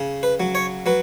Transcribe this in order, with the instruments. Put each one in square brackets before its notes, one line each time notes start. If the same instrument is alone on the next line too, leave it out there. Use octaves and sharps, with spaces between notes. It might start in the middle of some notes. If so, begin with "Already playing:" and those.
Already playing: [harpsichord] C#3
B4
F#3
C#5
F#3 B4